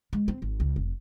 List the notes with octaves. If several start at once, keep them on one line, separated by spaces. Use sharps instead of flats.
G#3
C4
G#1
C#2
F1